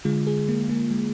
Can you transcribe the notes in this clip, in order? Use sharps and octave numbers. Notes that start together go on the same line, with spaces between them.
D3 G#3 F4
G#4
A#3
A#3
G#3